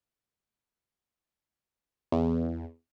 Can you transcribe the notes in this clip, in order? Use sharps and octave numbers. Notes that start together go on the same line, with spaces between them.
E2